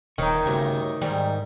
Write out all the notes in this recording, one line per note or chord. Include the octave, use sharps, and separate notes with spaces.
D#1 D#3 D#4 C#5
D2 G2 C#3
G#2 D#3 G3